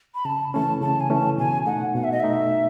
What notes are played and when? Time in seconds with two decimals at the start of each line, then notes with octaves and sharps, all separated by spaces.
0.15 B5
0.25 C#3 A5
0.54 E3 A3 C#4 A5
0.82 C#3 A5
1.00 G#5
1.10 E3 A3 C#4 A5
1.38 B2 G#5
1.66 A3 D#4 F#5
1.95 B2 F#5
2.04 E5
2.12 D#5
2.20 A3 D#4 E5